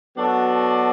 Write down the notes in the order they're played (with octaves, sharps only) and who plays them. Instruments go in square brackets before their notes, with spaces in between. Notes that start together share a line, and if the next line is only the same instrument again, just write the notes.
[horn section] F#3 B3 D4 F#4 A4